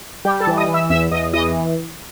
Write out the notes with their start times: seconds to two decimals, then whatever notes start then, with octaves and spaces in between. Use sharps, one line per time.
0.25 G3 G4 G5
0.40 A4 A5
0.47 E3
0.57 D#5 D#6
0.68 E3
0.74 E5 E6
0.90 E2 E5 E6
1.11 E2 D#5 D#6
1.33 E3 D#5 D#6